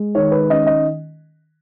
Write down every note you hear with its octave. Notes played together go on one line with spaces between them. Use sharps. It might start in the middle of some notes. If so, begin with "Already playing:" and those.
Already playing: G#3
D#3 C#5
B4
C#4 D#5
D#5